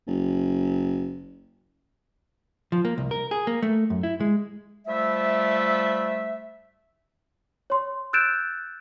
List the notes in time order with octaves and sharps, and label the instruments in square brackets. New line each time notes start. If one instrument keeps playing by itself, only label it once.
[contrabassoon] F#1
[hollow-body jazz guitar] F3
A#3
C2
A#4
G#4
A#3
A3
F#2
E4
G#3
[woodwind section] F3 G3 A3 E5
[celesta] C#5 C6
E6 F#6 G6 A6 D7 E7